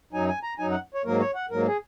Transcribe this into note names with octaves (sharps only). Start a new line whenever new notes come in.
F#2 F#3 D#4 G#5
G#5
A#5
F#2 F#3 D#4 G#5
F#5
C#5
G#2 F#3 A#3 A#4
C#5
F#5
G#2 F#3 A#3 A#4
G#4